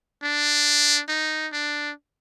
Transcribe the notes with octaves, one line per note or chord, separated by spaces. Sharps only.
D4
D#4
D4